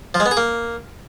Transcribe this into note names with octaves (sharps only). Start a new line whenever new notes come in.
F3
G#3
B3
G#4
A#3